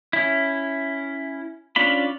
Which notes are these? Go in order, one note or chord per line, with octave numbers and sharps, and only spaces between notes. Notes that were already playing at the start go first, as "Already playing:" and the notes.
C#4 E4
C#4 D4 F4 B5